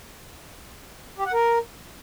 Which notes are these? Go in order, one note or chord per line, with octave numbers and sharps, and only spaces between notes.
G4
F#5
A#4